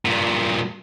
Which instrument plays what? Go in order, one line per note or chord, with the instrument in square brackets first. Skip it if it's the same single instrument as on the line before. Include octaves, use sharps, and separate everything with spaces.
[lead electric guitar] G2 A#2